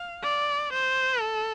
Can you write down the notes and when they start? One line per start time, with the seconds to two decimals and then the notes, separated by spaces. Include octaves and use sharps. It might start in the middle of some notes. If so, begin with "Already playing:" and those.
Already playing: F5
0.23 D5
0.73 C5
1.21 A4